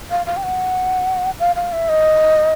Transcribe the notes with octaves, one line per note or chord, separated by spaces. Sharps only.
F5
F5
G5
F#5
F5
F5
E5
D#5